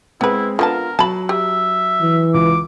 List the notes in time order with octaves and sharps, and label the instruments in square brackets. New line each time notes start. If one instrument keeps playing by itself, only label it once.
[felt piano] G#3 C4 [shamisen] B3 B4 [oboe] E4
[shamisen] D3 B3 A5 [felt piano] F4 [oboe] A#4
[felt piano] F#3 [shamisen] A5 B5
[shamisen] G4 [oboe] E5
[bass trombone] E3
[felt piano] C#2 [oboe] D6